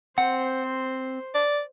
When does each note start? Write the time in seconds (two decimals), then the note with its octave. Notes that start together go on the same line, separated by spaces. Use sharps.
0.18 C4 C5 F#5
1.35 D5